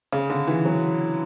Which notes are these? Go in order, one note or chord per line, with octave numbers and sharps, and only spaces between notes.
C#3
D3
E3
F#3